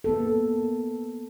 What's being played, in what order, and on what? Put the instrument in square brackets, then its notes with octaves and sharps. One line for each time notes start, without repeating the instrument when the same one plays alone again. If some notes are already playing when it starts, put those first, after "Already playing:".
[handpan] A#3 B3 A4